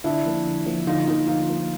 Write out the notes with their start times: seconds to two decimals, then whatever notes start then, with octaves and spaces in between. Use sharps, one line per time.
0.04 D3 D4 E4
0.25 F3 A#3
0.46 D3
0.66 F3 A#3
0.87 D3 D#4 F4
1.07 F3 A#3 D#4 F4
1.28 D3 D#4 F4
1.48 F3 A#3